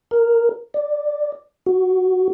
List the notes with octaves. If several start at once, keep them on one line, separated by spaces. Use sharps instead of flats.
A#4
D5
F#4